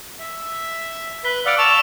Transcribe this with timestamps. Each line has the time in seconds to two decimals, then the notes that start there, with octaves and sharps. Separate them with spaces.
0.19 E5
1.25 B4 B6 G7
1.46 D5 F5 F#5 E6 D7
1.58 A5 C#6 E6 E7 F7